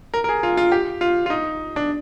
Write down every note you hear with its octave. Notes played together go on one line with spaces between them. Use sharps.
A#4
A#4
G#4
F4
F4
G4
F4
F4
D#4
D4